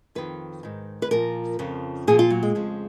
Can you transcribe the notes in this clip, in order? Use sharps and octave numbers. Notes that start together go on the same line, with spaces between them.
F2 D#3 B4
G#2 D#3
B4
A#2 F3 A#4
F2 C#3 F3
A#2 F3 G#4
F4
F#3
G#3
F2 C#3 F3